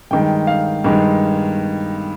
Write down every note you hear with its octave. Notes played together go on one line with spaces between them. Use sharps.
G2 D#3 G#3 G5
F5
G2 D#3 G#3